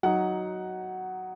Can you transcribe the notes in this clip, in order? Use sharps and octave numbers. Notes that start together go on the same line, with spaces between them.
F#3 D#4 F#5